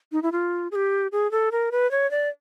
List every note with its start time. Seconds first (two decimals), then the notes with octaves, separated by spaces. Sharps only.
0.12 D#4
0.23 E4
0.32 F4
0.72 G#4
0.76 G4
1.12 G#4
1.31 A4
1.52 A#4
1.72 B4
1.91 C#5
2.11 D5